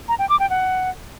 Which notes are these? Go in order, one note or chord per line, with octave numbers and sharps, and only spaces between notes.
A#5
G5
D6
G5
F#5